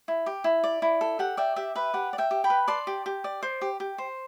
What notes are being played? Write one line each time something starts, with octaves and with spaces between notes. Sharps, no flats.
E4
G4
E4
D5
E4
A4
G4 F#5
D5 E5 G5
G4 E5
B4 E5
G4 F#5
D5
E5 G5
G4
G5 B5
B4
D5 A5 C6
G4
G4
D5
C5
G4
G4
C5